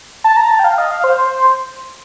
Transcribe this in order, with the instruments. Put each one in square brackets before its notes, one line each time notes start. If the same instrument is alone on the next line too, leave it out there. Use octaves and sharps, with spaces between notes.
[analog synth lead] A5
A#5
A5
G5
F5
D#5
F5
C5